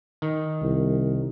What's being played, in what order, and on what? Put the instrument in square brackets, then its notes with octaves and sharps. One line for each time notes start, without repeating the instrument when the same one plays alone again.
[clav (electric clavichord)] D#3
[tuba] C2